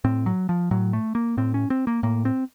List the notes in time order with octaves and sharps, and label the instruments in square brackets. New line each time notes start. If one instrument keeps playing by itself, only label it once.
[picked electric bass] A2 C4
F#3
F3
A2 F#3
A3
A#3
A2 C4
C#4
C4
A#3
A2 A#3
C4